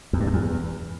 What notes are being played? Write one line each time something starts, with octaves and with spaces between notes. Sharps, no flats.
E2
G2
F#2
E2